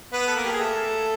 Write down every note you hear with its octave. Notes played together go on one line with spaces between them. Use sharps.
B3 B4
A4
A#3 A#4
G4
G#4
A3 A4